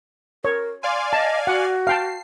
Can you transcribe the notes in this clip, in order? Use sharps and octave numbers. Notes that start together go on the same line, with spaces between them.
A#4 C#5
D5 F5 G#5 C6
D#5 A5
F#4 F#5
F5 G5 A5 C7